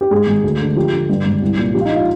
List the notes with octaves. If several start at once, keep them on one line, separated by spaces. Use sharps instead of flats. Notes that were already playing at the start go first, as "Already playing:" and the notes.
G4
G#2 G#4
G#1
D2
D3
F3 G4
D3
G2
G#1
C2
A#2
F3 G4
F4
D#4
F4